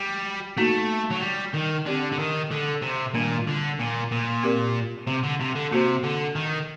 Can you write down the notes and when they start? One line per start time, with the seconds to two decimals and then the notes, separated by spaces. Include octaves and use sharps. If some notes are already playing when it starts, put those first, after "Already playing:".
Already playing: G3
0.57 A3 A#3 D#4 F#4
1.11 F#3
1.22 G3
1.54 D#3
1.86 D3 C4 G4 D5
2.12 D3
2.19 D#3
2.51 D3
2.82 C3
3.14 A#2 D#3 G3 D4
3.47 D3
3.79 A#2
4.11 A#2
4.43 C4 G4 A#4 D5
5.07 C3
5.23 D3
5.40 C3
5.55 D3
5.71 C3 A#3 F#4 C5
6.03 D3
6.35 D#3